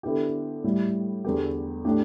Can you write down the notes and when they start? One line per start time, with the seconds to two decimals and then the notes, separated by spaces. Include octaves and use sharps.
0.03 D3 B3 E4 G4
0.64 A2 G3 E4 G4
1.24 E2 D3 B3 G4
1.85 A2 A3 D4 G4